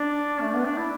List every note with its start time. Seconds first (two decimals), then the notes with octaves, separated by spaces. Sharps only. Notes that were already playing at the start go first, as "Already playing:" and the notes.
Already playing: D4
0.41 A3
0.54 B3
0.65 D4
0.77 E4